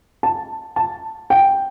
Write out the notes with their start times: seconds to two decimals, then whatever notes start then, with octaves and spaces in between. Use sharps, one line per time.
0.23 A5
0.76 A5
1.30 G5